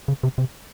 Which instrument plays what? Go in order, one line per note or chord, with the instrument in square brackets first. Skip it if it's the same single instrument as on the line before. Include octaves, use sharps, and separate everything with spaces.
[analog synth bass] C#3
C3
C3